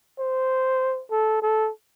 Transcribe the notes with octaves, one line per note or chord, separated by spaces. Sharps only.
C5
A4
A4